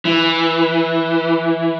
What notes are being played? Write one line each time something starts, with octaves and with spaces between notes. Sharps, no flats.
E3